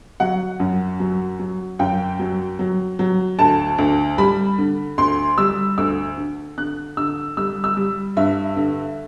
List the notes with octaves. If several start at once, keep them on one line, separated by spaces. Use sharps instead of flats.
F#3 F#5
F#2
F#3
F#3
F#2 G5
F#3
F#3
F#3
D2 A5
D2
G3 B5
D3
D2 C6
G3 E6
D2 E6
D3
D3 F#6
D3 E6
G3 E6
E6
G3
G2 E5
D3